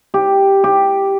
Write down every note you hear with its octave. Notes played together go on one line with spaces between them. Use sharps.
G4
G4